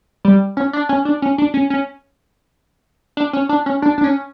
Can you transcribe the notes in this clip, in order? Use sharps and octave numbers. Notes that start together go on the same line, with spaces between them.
G3
C#4
D4
C#4
D4
C#4
D4
C#4
C#4
D4
C#4
D4
C#4
D4
D4
C#4